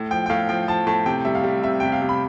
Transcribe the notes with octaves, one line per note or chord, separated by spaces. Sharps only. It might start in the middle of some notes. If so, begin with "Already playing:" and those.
Already playing: A2
F3 G5
G5
A2 F5
F3 G5
F3 A5
A2 A5
C3 G5
G3 E5
F5
G3
C3 E5
C3 G5
F5
C3
B5